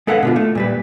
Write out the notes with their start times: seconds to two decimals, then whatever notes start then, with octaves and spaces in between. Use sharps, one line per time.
0.07 G#3 A4 B4 F5 F#5
0.23 B2 D3 F4
0.36 A3
0.55 A#2 G3 B4